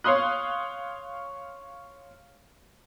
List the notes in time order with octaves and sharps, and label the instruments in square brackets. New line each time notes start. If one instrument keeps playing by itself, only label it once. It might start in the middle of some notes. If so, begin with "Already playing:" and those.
[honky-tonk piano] C#5 F5 C6 D#6 F#6